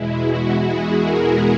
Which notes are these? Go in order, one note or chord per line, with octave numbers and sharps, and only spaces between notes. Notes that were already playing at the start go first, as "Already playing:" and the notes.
Already playing: E2 B2 G#3 E4
F#4
G#4
A#4